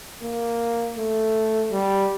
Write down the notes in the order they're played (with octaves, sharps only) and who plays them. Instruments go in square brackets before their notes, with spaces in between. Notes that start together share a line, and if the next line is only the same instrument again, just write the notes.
[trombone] A#3
A3
G3